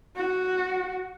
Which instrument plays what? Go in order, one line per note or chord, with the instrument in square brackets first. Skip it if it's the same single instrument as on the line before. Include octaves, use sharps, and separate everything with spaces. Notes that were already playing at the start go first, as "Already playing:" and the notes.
[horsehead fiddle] F#4